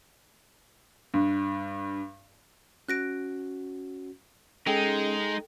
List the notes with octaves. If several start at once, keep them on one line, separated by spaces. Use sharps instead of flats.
G2
C#4 F#4 F#6 A#6 D7
G#3 C#4 D#4 G#4 A4 G5